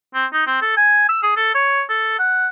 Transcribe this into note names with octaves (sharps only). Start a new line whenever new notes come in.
C4
D#4
C4
A4
G#5
E6
G#4
A4
C#5
A4
F#5